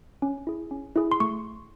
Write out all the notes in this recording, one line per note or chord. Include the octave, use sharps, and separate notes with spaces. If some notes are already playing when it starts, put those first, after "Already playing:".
C#4
E4 G#4
C#4
E4 G#4
C6
A3 C#6